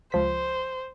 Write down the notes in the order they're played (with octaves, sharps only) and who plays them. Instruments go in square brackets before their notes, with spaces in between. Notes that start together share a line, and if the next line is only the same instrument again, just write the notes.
[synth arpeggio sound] C#2 F3 B6 [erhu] C5